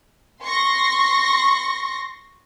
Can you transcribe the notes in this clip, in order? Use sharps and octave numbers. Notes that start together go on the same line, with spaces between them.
C6 C#6 A#6